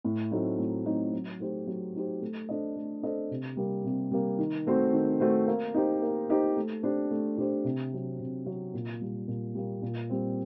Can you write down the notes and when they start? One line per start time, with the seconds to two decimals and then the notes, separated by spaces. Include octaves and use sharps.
0.04 A2
0.31 F#3 A3 C4 D#4
0.59 A2
0.86 F#3 A3 C4 D#4
1.13 F#3
1.40 A3 D#4 G4 C5
1.67 F#3
1.94 A3 D#4 G4 C5
2.21 A3
2.49 D4 A4 C5 D#5
2.76 A3
3.03 D4 A4 C5 D#5
3.31 C3
3.57 G3 A#3
3.85 C3
4.11 G3 A#3
4.38 D#3
4.67 A3 C4 F#4 C5
4.93 D#3
5.20 A3 C4 F#4 C5
5.47 A#3
5.74 D#4 G4 C5
6.02 A#3
6.30 D#4 G4 C5
6.57 A3
6.83 D4 G4 C5
7.11 A3
7.38 D4 G4 C5
7.64 C3
7.93 F#3 C4
8.20 C3
8.46 F#3 C4
8.74 A#2
9.01 G3 A#3
9.28 A#2
9.55 G3 A#3
9.82 A#2
10.10 G3 C4